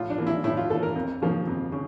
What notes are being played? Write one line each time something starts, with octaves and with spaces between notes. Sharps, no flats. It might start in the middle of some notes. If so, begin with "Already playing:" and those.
Already playing: A2 F4
D4
E3 A#3
E4
A2 E4
F4
E3 A#3 A4
A#4
F2
C#3 F3 A#3
F2
C#3